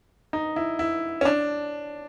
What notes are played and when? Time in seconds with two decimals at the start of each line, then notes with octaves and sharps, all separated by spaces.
0.33 D#4
0.56 E4
0.79 E4
1.21 C#4
1.25 D4